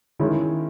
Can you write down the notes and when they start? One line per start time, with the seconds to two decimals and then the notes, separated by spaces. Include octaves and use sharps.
0.19 D#3 G#3 C#4 E4